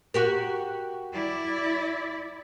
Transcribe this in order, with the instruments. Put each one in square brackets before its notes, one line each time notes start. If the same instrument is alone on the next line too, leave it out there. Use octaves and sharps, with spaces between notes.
[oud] F#4 G4 A#4
[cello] E4 D5